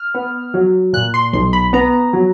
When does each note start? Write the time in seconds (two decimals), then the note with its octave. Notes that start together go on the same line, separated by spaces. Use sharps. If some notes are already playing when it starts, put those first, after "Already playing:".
Already playing: F6
0.14 B3
0.54 F#3
0.93 A#2 F#6
1.14 C6
1.33 B1 C6
1.53 B5
1.73 B3 A#5
2.13 F#3